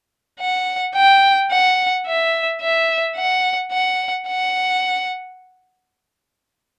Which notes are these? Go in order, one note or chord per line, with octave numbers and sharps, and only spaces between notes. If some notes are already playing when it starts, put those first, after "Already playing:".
F#5
G5
F#5
E5
E5
F#5
F#5
F#5